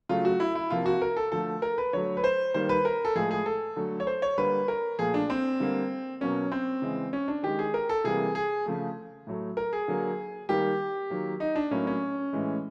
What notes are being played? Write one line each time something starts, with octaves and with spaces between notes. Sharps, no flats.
C#3 F#3 A3 F4
F#4
E4
E4
C3 F3 A#3 F4
F#4
A#4
A4
D3 F3 A3 A4
A#4
B4
D3 F#3 A3 C#5
B4
C5
D#3 G3 A#3 C5
B4
A#4
A4
A2 F3 G#3 G#4
G#4
A4
D3 F#3 A3
C#5
C5
C#5
D3 G3 A#3 B4
A#4
A#2 F3 A3 G#4
D4
C4
D3 G3 A#3
B2 F#3 A#3 C#4
C4
C#3 E3 G#3
C#4
D4
D#3 G#3 G4
G#4
A#4
A4
C3 E3 G3 A#3 G#4
G#4
C#3 F3 A3
A2 F#3 A3
A#4
G#4
D3 F#3 A#3
D#3 G3 A#3 G4
D#3 F#3 A#3
D#4
D4
A2 F#3 A#3 C#4
C#4
A2 E3 G#3